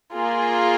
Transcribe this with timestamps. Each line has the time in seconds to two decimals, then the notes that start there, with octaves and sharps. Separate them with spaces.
0.13 A#3 F4 G#4